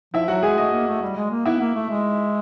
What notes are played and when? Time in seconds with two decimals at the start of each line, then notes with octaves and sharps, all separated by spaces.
0.14 F3 E4 E5
0.28 F#3 F#4 F#5
0.43 G#3 G#4 G#5
0.57 A3 D#5
0.72 A#3
0.87 A3
1.02 G3
1.16 G#3
1.31 A#3
1.46 B3 E4 E5
1.61 A#3
1.75 A3
1.90 G#3